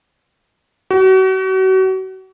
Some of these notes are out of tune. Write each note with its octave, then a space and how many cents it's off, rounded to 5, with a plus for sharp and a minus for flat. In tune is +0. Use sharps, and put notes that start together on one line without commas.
F#4 +35